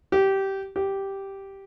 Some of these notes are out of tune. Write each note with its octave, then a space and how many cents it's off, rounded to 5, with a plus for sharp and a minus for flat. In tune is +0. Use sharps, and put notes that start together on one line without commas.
G4 -15
G4 -5